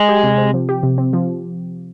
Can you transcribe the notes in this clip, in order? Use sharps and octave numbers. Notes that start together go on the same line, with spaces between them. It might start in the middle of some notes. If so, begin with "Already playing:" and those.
Already playing: G#3
G4
C3
C4
F3
G4
C3
C4
F3